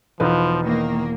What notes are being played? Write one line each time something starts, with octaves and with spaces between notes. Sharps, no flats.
E1 F3 D#4 F4 B4
D#3 A#3